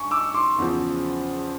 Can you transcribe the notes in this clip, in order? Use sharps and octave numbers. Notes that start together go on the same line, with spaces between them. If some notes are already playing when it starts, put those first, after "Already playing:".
Already playing: G2 G#5 C#6
D6 E6
C6 D6
E2 C#3 F3